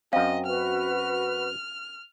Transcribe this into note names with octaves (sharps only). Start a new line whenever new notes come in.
F#2 C4 D#5 F5
F#4 B4 F6